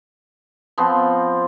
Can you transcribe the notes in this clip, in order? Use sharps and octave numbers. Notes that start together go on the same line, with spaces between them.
F3 B3 C4